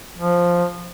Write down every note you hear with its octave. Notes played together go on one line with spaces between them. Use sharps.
F3